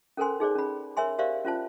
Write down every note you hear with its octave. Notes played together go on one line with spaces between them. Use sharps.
C#4 A4 A#4 C5 G#5 C6
D#4 G#4 C5 D5
C#4 B5
A#4 C#5 E5 G#5 C6
G4 A#4 C5 D5 E5 F5
C#4 F4 C5 A5